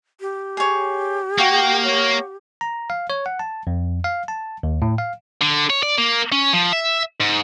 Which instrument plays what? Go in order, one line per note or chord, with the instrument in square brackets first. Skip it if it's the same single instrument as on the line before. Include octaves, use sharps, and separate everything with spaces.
[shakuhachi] G4
[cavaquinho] G#4 C#5
[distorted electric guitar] A#3 [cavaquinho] F#4 F5 [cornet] G5
[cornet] C#5
[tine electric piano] A#5
F5
C#5
F#5
A5
F2
F5
A5
D#2
A2
F5
[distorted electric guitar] D3
C#5
D5
A#3
C#4
F3
E5
G#2